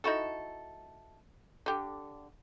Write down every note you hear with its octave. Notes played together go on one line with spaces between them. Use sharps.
D#4 E4 F#4 A4
D3 G4